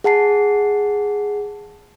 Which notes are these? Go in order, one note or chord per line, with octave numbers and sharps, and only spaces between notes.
G#4 F#5 A5 C7